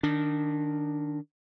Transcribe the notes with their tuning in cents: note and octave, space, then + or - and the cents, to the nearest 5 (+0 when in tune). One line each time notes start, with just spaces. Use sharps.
D#3 -20 D4 -5